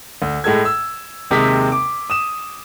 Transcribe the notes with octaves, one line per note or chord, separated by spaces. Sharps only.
D2
A2 G#3 A4 G#6
E6
D#2 C3 G#3 G5 D#6 B6
D6
D#6 E7